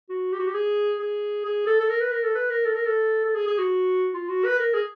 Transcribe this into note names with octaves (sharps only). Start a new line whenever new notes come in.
F#4
G4
F#4
G4
G#4
G#4
G#4
A4
A4
A#4
B4
A#4
A4
B4
A#4
A4
A#4
A4
A4
G#4
G#4
F#4
F4
F#4
B4
A#4
G#4